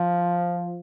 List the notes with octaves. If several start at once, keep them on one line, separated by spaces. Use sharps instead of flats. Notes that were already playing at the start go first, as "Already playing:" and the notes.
Already playing: F3